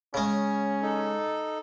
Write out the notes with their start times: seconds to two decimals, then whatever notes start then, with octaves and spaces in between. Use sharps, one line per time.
0.14 C#3 G#3 C#4
0.82 D#4 A4